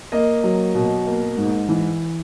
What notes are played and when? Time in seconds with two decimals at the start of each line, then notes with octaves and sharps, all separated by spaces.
0.12 A#3 D#5
0.44 F#3
0.75 B2
1.06 A#3
1.37 G#2
1.69 E3